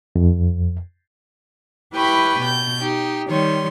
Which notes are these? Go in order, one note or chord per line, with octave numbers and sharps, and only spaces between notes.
F2
E4 G4 B4 G5 B5 C#6
B2 G6
D#4 G4
D#3 G3 C#5 C6